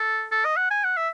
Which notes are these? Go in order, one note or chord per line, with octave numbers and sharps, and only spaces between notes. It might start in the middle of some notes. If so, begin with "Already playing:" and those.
Already playing: A4
A4
D#5
F#5
G#5
F#5
E5